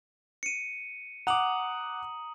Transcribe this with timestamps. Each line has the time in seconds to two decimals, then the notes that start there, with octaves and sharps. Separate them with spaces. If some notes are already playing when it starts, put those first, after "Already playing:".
0.43 C#7 D#7
1.27 F#5 A#5 D6 D#6 F#7